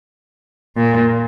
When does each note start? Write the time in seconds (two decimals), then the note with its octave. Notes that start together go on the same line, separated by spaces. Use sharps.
0.76 A#2